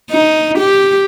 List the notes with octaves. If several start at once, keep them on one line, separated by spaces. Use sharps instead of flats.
D#4
G4